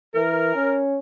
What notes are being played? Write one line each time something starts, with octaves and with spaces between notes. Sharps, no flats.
E3 A#4
C#4